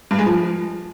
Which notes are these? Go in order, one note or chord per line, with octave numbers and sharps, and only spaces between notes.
G2
G#3
F3